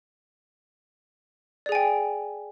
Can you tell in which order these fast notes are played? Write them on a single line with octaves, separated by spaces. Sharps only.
D5 G#4 G#5 G5